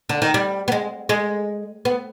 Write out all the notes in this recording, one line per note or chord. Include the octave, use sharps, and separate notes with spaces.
D3
D#3
G3
B3
G#3
G#3
B3